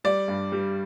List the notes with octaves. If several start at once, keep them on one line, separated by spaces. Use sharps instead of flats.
G3 D5
G2
G3